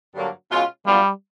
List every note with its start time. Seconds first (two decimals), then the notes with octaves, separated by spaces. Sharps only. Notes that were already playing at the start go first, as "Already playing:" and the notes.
0.15 G2 D3 F#3 A#3
0.51 B2 G#3 C#4 F4
0.86 A#2 F#3 G3 B3 D4 F4